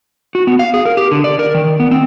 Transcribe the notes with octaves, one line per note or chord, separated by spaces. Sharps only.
F#4
B3
F5
G#4
A#4
G4
D3
D5
A#4
D#3
B3
C4